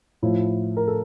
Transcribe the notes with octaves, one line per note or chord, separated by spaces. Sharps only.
A2 F3 E4
A#4
A4